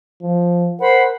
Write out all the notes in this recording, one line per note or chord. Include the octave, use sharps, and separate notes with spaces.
F3
A#4 C5 F#5 B5